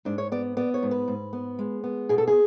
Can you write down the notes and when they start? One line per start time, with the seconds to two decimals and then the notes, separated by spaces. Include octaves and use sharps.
0.05 G#2 D4
0.18 C#5
0.32 B3 D5
0.57 B3 D5
0.74 C#5
0.83 G#2
0.91 B4
1.08 G#2
1.33 B3
1.59 G#3
1.84 B3
2.09 B2 G#4
2.18 A4
2.28 G#4